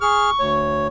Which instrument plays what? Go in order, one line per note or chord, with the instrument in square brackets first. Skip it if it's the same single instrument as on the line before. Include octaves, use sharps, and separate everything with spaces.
[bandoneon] G#4 F6 [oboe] C#6
[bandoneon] D2 C#5